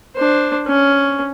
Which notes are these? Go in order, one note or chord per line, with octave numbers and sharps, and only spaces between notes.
D4 C5
C#4